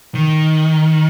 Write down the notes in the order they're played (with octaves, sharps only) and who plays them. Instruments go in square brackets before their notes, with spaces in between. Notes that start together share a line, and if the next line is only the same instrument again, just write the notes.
[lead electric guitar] D#3